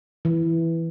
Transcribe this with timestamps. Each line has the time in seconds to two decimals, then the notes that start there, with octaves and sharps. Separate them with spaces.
0.25 E3